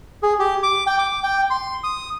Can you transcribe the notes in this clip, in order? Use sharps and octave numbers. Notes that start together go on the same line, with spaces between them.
G#4
G4
D6
G5
D6
G5
C6
D#6